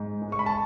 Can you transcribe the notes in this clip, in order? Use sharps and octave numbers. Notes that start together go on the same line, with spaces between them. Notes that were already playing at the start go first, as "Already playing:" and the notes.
Already playing: G#2
G#3
C#6
B5
A5